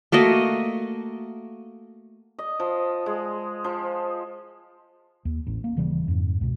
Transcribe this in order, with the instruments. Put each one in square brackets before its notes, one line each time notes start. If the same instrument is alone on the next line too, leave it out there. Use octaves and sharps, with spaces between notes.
[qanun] A3 A#3 F#4 D#5
[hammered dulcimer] D#5
F3
G#3
F3
[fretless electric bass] D#2
A1
A#3
D#1 C#3 E3 G3
F2 G#2
C#2 B2